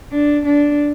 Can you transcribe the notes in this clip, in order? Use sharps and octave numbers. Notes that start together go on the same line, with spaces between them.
D4
D4